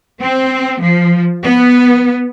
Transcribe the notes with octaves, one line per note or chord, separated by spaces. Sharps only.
C4
F3
B3